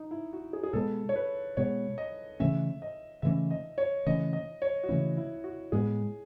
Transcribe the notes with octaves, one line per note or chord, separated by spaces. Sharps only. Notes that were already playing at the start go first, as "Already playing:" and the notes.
Already playing: D#4
E4
F#4
G#4
G#4
B2 G#3 B3 A4
C#5
B4
B2 G#3 B3 C#5
D#5
C#3 E3 A3 C#4 E5
D#5
C#3 E3 A3 C#4 E5
D#5
C#5
C#3 E3 A3 C#4 D#5
D#5
C#5
F#4
C#3 E3 A3 C#4 E4
E4
F#4
A2 G#3 B3 G#4